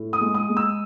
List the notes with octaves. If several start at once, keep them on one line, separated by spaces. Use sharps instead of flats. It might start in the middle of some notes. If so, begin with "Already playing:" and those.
Already playing: A2
D#6
G#3
D#6
G#3
E6